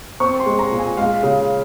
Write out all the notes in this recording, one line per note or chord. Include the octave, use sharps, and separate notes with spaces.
C4 C#6
C6
G#3
A#5
A#2
G#5
G#3 F5
C#3